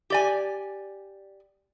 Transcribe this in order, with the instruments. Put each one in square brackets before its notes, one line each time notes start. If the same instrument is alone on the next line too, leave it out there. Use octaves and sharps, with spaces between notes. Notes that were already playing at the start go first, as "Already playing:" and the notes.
[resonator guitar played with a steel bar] G4 D5 G#5